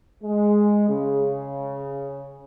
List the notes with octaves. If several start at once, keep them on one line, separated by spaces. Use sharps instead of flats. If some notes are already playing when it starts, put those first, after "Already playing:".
G#3
C#3